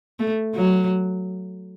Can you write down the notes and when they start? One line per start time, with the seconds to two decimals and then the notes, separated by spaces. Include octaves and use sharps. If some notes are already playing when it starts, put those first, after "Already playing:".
0.19 A3
0.55 F#3